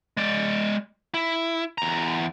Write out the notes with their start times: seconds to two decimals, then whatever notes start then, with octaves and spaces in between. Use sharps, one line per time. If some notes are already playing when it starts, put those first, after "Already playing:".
0.17 G#3 D5
1.14 E4
1.78 E2 A#5